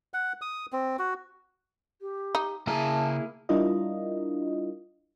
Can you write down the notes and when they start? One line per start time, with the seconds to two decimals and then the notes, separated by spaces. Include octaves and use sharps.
0.14 F#5
0.42 D#6
0.73 C4
0.99 F#4
2.01 G4
2.35 D#4
2.67 C#3 A#3 E4 G#4 A5 A#5
3.49 G3 D4 E4 F4 A#4 D#5